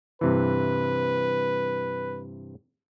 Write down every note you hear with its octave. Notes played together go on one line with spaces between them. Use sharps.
G2 C3 E3 B4